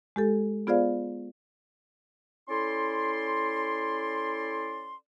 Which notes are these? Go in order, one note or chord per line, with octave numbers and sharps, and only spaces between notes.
G#3 G4 A4
B3 F4 G#4 C5 D5 F5
C#4 E4 A4 D5 C6